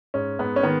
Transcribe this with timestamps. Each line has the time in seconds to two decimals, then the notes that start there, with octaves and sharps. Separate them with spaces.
0.14 G#2 C#4
0.39 G#2 B3
0.56 C#4
0.63 D#3 B3